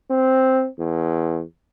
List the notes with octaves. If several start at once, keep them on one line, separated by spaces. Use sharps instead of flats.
C4
E2